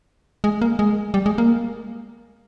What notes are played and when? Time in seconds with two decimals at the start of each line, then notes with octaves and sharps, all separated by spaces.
0.44 G#3
0.62 A#3
0.79 G#3
1.14 G3
1.26 G#3
1.38 A#3